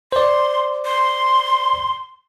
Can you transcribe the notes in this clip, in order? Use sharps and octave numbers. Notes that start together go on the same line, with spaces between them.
C5 D5 C6
C6